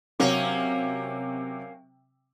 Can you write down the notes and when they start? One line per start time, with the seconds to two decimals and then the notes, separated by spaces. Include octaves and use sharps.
0.20 C3 F#3 A#3 C#4 A#4